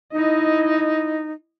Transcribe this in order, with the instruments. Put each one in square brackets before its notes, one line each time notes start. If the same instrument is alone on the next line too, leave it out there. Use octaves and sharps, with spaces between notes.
[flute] D#4 [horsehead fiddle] E4 D#5